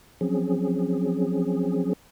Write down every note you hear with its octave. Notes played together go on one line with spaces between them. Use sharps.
F3 F#3 C4 C#4 G#4